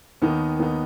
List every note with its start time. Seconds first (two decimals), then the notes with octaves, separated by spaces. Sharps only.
0.22 D#2 D#3 B3 D#4
0.59 D#2 D#3 B3 D#4